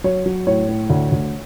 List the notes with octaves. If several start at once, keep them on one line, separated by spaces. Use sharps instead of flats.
F#3 C#5
F#3
A2 C#5
A2
D2
D2